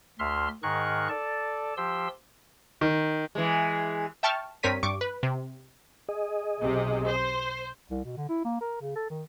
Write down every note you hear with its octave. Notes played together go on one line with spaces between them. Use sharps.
D2 E5 C6 F6
G#2 D#3 G#4 A#4 C#6 F#6
A4 D5 A5
F3 G4 C6 E6
D#3
E3 G#3
E5 G5 A5 C#6 F6
G2 C4 A#4 C#5 B6 D#7
G2 C#6 D6
B4
C3
G#4 D#5
B1 C3
C5
C2
B2
D3
E4
A#3
A#4
C#3
A4
D#3